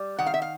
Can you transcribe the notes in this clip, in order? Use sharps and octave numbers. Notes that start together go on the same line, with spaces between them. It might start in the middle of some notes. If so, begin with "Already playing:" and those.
Already playing: G3
D#3 F#5
F5
E5
F5